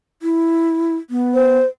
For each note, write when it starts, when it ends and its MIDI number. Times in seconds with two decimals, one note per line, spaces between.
0.22 0.96 64
1.10 1.58 59
1.35 1.65 72